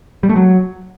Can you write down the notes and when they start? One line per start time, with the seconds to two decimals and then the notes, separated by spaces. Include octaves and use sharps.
0.23 G3
0.29 A3
0.36 F#3